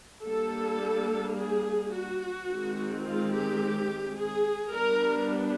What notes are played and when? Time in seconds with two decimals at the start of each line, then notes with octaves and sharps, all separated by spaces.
0.24 G3 A#3 D4 A4
1.36 G#4
1.93 F#4
2.48 D#3 G#3 C4
3.05 F4
3.33 G4
4.17 G#4
4.74 G3 B3 D4 A#4